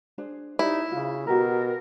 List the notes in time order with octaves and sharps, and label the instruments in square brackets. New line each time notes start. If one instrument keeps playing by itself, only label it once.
[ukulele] D4 G#4 C5
[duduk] D#4 [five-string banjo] E4 [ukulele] G4 C5 D5
[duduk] C#3 [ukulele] F4
[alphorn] B2 [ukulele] F#4 G4 A#5 [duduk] A#4